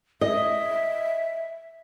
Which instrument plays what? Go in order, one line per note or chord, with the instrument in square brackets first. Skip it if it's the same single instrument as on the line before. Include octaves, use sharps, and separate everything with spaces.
[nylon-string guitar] D#5 [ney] E5